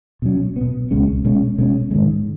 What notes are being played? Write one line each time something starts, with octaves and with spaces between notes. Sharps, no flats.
B2 F#3 C#4
B2 B3
C#2 B2 G#3 C#4
B2 G#3 C#4
B2 G#3 C#4
G#2 D#3 G#3